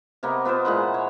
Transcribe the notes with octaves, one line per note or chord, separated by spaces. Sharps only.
C3 A#3 B3 D#5
B3 F4 A#4 C5
A#2 E3 G#3 F#5
C#5